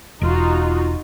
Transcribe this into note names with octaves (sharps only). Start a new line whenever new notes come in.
E1 D#4 F4 F#4